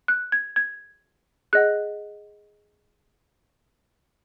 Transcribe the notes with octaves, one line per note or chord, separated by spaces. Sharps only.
F#6
G#6
G#6
G#4 D#5 F#5 F#6